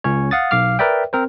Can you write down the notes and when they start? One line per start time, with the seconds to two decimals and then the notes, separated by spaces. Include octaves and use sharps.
0.04 C#2 C#4 C#5
0.31 F5 F#5 D#6 A6
0.51 B1 F5 D6 F6
0.79 A#4 B4 D5 E5 G5
1.13 C4 A#4 C5